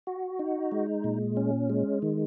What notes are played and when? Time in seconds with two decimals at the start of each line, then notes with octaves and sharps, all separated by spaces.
0.07 F#4
0.39 D#4
0.72 G#3
1.04 A#2
1.37 C#4
1.69 G#3
2.02 D#3